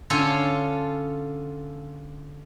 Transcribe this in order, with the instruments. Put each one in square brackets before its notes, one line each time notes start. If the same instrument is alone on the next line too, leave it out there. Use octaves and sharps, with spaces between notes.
[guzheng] D3 C#4 F4 A4 G#5